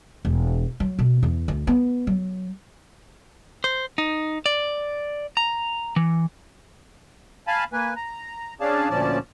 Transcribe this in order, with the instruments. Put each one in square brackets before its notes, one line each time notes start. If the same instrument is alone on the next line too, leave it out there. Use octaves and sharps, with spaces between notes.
[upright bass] E1
F#3
B2
E2
D2
B3
F#3
[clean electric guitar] C5
D#4
D5
A#5
E3
[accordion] F5 G#5 A5 B5
A#3 B4 G#5
A#5
C#4 D4 G#4 D5 F5 A5
D2 A#2 F3 C#4 D5 A5